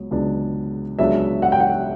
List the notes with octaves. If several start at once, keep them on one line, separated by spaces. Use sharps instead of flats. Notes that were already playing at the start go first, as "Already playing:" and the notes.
Already playing: C#2 F#3 B3
C#2 C#3 F#3 B3 D4
C#2 C#3 F#3 B3 D4 E5
F#5
G5
F#5